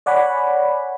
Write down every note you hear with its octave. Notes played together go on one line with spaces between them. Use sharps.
C#5 D5 F#5 G#5 B5